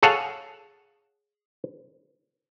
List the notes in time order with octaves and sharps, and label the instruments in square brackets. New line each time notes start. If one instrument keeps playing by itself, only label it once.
[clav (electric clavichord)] G#4 A4 C#5 F5 F#5 A5